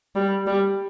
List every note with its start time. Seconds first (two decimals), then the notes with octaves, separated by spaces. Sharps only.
0.16 G3
0.47 G3